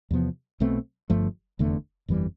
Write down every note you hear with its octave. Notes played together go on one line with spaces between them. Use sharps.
E2 C3 F3 B3
B1 B2 A3 C4
G1 G2 F3 A3
F1 E2 D3 A3
G1 F2 E3 G3